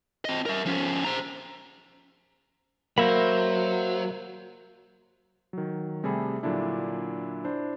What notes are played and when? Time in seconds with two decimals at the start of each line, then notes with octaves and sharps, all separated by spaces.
0.25 C4 D#5
0.46 A#4 E5
0.65 F3 C#4
1.05 C5 A#5
2.98 F#3 A#3 C5 E5 B5
5.53 D#3 F#3
6.03 C3 G3 A3 G#4 A4 B5
6.43 A#2 D3 F#3 D4 E4
7.45 D4 E4 C5